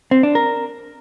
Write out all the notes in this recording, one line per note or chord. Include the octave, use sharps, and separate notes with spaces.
C4
D4
A#4